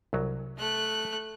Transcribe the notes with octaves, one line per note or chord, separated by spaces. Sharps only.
C2 F#3
A3 F#6